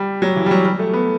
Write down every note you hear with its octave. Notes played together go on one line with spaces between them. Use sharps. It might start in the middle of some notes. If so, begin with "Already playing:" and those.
Already playing: G3
F#3
E3
G3
F#3
G3
A3
B3